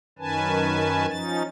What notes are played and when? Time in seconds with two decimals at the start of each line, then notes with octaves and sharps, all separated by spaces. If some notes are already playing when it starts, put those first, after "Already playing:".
0.19 F#2 D#3 C#4 B4 G#5 A5
1.09 F3 C#4 D#4 A6